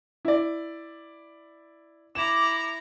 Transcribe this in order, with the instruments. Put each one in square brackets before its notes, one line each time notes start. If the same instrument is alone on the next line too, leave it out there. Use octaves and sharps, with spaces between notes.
[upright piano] E4 D5
[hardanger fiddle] E4 A#5 [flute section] D6 [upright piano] E7